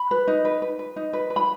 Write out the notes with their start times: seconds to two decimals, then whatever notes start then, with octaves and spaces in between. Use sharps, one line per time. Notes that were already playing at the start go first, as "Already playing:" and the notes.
Already playing: B5
0.11 B4
0.28 D#4
0.45 B4
0.62 B4
0.79 B4
0.96 D#4
1.13 B4
1.30 B4
1.36 B5